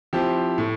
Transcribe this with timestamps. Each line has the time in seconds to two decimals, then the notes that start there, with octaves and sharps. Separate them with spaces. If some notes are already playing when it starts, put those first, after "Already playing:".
0.13 F3 C4 E4 G4
0.58 A2